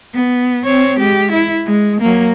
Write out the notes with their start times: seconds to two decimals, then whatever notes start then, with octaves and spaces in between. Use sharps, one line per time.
0.14 B3
0.64 C4 C#5
0.99 G#3 G4
1.32 E4
1.66 G#3
2.01 F#3 A#3